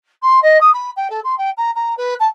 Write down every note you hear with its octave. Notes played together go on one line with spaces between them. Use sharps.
C6
D#5
D#6
B5
G5
A4
C6
G5
A#5
A#5
B4
A5